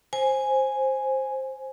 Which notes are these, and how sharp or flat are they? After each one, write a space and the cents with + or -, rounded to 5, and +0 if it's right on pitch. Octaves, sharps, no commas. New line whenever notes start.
C5 +10 G#5 +0